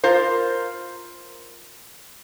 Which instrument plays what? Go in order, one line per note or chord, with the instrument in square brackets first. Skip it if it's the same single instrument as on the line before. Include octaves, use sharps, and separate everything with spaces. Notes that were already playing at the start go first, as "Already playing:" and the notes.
[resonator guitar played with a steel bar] F4 A#4 C5